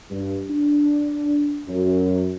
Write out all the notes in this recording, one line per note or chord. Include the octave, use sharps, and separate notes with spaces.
G2
D4
F#2